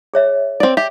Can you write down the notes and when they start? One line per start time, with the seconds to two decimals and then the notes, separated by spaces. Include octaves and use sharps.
0.14 G#4 C#5 E5
0.60 C4 D5
0.77 G4 E5